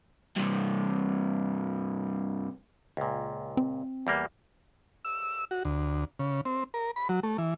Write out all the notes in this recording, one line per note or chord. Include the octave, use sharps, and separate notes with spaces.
G2 C3
C#2 A#2
C4
E2 G3 A#3
E6
F#4
D2
C#3
C4
A#4
B5
F#3
A3
E3